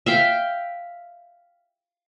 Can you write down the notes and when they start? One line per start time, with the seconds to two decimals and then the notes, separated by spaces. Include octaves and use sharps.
0.06 E5 F5 G5